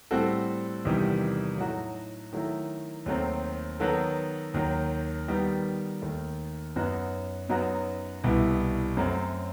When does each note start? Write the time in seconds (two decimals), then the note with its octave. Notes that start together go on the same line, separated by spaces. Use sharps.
0.11 A2 G3 C4 F#4 A4
0.85 E2 C3 D#3 G3 D#4
1.58 A2 F#3 A3 D#4 F#4
2.33 D#3 F#3 A3 E4
3.06 D#2 D#3 F#3 A3 C4
3.80 D#3 F#3 B3 F#4 A4
4.54 D#2 D#3 F#3
5.28 D#3 G3 B3 D#4
6.02 D#2 D#3 A3
6.76 F#2 F#3 B3 D#4 F#4
7.49 F#2 F#3 B3 D#4 F#4
8.24 C2 B2 G3 B3 E4
8.97 F#2 F#3 A3 C4